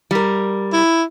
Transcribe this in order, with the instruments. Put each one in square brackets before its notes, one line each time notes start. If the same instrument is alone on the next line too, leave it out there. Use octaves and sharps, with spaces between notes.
[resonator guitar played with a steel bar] G3 A#4
[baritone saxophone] E4